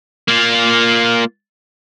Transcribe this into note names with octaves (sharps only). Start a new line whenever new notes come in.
A#3 F4